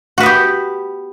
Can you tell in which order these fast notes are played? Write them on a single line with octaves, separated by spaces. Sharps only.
F#4 B4 B3 G4